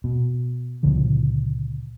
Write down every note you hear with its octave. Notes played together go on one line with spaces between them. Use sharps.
B2
C#2 A#2 D3 F3